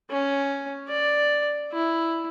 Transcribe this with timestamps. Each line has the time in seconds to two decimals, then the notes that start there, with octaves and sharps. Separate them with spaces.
0.10 C#4
0.88 D5
1.73 E4